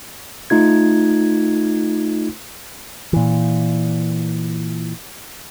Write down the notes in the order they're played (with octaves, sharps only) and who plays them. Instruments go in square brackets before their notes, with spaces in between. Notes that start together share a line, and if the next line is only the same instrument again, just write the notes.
[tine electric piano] A3 D#4 F4 G#6
[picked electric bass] A#2 E3